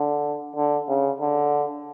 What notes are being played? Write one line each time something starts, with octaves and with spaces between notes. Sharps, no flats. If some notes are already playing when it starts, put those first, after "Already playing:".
Already playing: D3
D3
C#3
D3